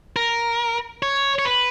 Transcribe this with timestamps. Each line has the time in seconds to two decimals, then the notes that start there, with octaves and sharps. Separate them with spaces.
0.16 A#4
1.02 C#5
1.39 C#5
1.45 B4